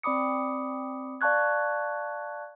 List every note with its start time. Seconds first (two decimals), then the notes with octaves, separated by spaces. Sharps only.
0.03 C4 D5 B5 D6 D#6 C#7
1.21 D5 F5 A5 C#6 F#6 G#6